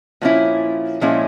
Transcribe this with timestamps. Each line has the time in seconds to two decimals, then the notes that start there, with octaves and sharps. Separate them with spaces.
0.21 A#2 F3 G#3 C#4 E4
1.01 A#2 F3 G#3 C#4 E4